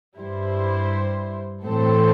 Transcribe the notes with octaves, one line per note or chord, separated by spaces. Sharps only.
G2 G3 E4 C5
A2 E3 C4 A4 C5